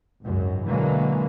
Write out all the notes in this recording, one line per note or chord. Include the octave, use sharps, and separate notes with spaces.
G#1 C#2 F#2
B2 D3 E3 F#3 G#3 A#3